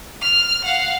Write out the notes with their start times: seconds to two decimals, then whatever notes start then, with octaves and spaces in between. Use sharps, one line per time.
0.22 F6
0.64 F5 F#5